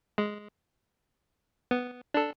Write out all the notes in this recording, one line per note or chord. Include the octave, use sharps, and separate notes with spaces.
G#3
B3
D4 A4